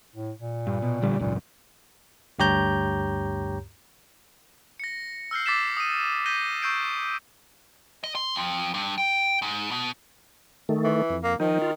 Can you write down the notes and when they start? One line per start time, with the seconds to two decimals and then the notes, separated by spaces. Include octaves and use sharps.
0.16 A2
0.39 A#2
0.67 G2
0.82 B2
1.02 A1 D3 G3
1.19 G#1 C#2 F#2 A#2
2.39 D2 G2 G4 C#5 A#5 G6
4.80 A#6 C#7
5.31 E6 F6 G6 C7
5.46 D6 E6 A6 B6 C7 E7
5.77 D#6 D#7
6.26 G6 A#6 B6 D#7 G7
6.62 C#6 E6 G6 C7 D7
8.04 D#5
8.15 C6
8.35 F2
8.74 G2
8.98 G5
9.42 G#2
9.71 B2
10.69 D#3 A3
10.84 E3
11.10 F2
11.23 A#3
11.40 D#3 F3 D#4
11.62 F4